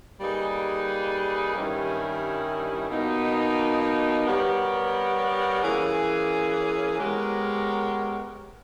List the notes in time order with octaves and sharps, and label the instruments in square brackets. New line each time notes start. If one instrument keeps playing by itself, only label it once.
[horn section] G3 A#3 D#4 G#4 B4
G2 D#3 G3 C#4 E4
B2 A#3 D#4
G3 B3 G4 A#4 C#5
E3 A#3 C#4 G#4
G#3 B3 G4 A#4 C#5